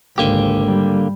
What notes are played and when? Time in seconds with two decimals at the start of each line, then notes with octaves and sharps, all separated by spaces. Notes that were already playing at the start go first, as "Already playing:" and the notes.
0.18 G#1 C#2 D3 A#3 G4
0.65 G3